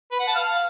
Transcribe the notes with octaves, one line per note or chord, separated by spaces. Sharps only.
B4
F#5
A5
F5